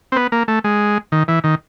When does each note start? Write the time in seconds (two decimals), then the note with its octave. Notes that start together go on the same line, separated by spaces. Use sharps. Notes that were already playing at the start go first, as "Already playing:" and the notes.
0.12 C4
0.16 B3
0.32 A#3
0.48 A3
0.64 G#3
1.12 D#3
1.28 E3
1.44 D#3